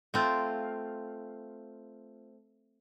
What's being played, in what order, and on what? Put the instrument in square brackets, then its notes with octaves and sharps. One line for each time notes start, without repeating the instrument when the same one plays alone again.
[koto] A3 C4 F4